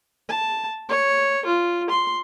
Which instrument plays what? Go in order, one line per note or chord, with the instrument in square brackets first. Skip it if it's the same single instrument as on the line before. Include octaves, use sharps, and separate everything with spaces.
[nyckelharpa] A5
C#5
F4
C6